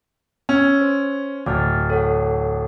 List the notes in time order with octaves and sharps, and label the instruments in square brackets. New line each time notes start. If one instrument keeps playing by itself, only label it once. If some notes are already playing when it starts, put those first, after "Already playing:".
[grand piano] C#4 [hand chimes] E6
[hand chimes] C5
[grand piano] D1 [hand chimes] D6 F6 A6
[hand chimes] A4 C#5 F#5